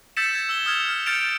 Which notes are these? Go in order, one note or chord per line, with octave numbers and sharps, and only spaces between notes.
E6 G6 A6 B6 C#7 E7
G#6
E6 G7
D#6 F6 G#6
F6 G#6
F6 G6 A6 C#7 D7 F7